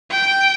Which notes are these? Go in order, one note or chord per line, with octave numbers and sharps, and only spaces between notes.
G5